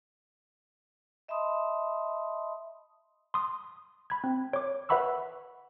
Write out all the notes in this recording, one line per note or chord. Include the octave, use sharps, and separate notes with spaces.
D#5 E5 A5 B5 C6 D#6
C6 D#6
B5 G#6
C4
C#5 D6
B4 E5 F#5 B5 C#6 E6